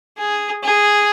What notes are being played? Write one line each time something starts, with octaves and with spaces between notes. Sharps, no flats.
G#4
G#4